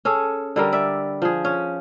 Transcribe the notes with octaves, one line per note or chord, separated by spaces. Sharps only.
C#4 G#4 A4
D3 G3 A#4
D5 E5
F3 G#4
C#4